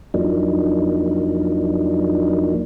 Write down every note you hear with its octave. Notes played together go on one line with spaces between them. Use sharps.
F2 F3 F#3 A#3 D4 D#4